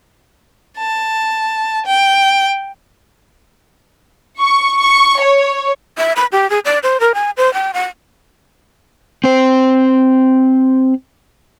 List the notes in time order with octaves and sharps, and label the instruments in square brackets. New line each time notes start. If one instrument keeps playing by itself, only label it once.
[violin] A5
G5
[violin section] C#6
C#6
C#5
[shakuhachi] E5
B5
G4
G#4
D5
C5
A#4
G#5
C5
G5
F#5
[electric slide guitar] C4 C5